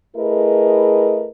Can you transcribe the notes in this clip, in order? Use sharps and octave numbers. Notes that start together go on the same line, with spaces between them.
A3 E4 G#4 A#4 B4 D#5